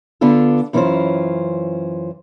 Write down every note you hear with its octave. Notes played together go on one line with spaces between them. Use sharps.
D3 B3 D4 F4 A4
F#2 E3 C#4 D4 F4 C5